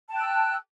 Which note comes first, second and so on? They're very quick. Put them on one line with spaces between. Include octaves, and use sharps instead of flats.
A5 G5 F#6 E6